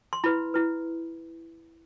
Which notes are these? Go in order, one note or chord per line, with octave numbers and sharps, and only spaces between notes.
C6
E4 B4 B5
E4 B4